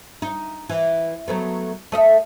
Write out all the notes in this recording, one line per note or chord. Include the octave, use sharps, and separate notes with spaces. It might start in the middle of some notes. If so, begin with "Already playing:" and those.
D#4
E3
F#3 A3 B3
A3 D#5 E5